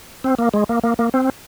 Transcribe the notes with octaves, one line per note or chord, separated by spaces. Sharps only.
C4
A#3
G#3
A#3
A#3
A#3
C4